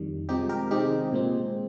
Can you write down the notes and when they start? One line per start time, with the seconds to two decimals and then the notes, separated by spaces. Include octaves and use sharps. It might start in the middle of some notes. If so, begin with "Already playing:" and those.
Already playing: F2 D#3 G3
0.29 C3 F3 G#3 C4 D#4 G4
0.49 G4 A#4
0.71 C3 D#3 G#3 C4 D#4 G4
1.13 A#2 G#3 C4